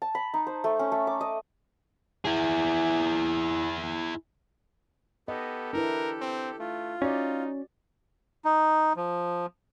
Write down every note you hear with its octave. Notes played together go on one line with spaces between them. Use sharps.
A5
B5
D#4
C5
A3
C#4
A3
D6
D#5
E4 G#4
B3 G4 A4 D#5
D4 E4 A#4 B4
C4
A3 F4
C#4 D#4 F#4 D5
D#4
F3